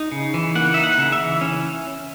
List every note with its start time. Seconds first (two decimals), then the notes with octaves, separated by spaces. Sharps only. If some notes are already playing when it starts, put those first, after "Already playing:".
Already playing: D#4
0.12 C#3
0.34 E3
0.55 A#3 F#5
0.74 D#4 E5
0.84 F#5
0.98 C#3
1.12 E5
1.19 E3
1.41 C#4